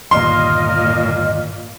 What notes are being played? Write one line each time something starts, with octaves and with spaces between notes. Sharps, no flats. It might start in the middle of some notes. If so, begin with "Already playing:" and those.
G1 D#2 A#2 D#5 C6 F6